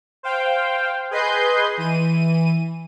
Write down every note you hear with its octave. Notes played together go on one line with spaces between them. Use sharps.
C5 F5 G5
G#4 B4 D#5 C6 G6
E3 D#7